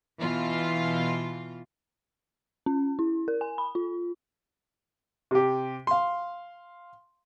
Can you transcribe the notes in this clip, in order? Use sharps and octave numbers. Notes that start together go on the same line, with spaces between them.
B2 E3 F4
C#4
E4
A#4
G#5
B5
F4
C3 G4
F5 C6